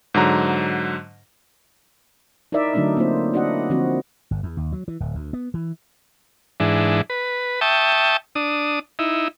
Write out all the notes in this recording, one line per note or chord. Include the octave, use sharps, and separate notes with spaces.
G#2 D3 F#3 A#5
D#4 E4 A#4 D5 E5
D3 F#3 A3 D4 D#4 D5
A#3 C4 D#4 F4 C5
D4 E4 F#4 D#5 E5 F#5
D3 F3 C4 F#4
G1
E2
D#2
F#3
E3
D1
D2
B3
E3
G#2 E3 D4
B4
E5 G5 A5 C#6 D#6
D4 D#6
D#4 E4